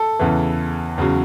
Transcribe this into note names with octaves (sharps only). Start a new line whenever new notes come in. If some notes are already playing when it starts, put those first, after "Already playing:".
Already playing: A4
E2 C#3 E3
E2 C#3 F#3